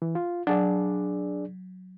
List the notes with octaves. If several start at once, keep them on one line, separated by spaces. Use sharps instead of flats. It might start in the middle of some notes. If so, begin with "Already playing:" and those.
E3
F4
F#3 D4 G#4 D5